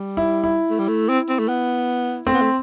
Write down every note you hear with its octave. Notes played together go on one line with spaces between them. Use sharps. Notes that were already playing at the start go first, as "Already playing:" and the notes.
Already playing: G3
E4
E4
A3
G3
A3
C4
C4
A3
B3
A3 C4
B3
A3